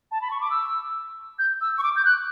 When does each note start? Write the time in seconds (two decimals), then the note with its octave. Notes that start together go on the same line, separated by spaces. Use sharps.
0.12 A5
0.22 B5
0.31 C#6
0.41 D6
0.51 E6
1.39 G6
1.61 E6
1.78 C#6
1.83 D6
1.96 G6
2.05 F#6